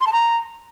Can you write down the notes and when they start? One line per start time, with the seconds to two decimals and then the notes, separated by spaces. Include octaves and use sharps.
0.01 C6
0.07 A5
0.13 A#5